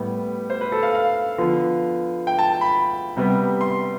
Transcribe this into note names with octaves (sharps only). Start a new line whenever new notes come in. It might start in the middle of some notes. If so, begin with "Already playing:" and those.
Already playing: A2 G3 B3
C5
B4
A4
F5
F5
D3 F3 B3
G5
A5
B5
C3 G3 B3
C6